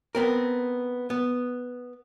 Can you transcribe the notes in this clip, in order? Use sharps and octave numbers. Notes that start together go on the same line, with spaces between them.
B3 C4 A#4
B3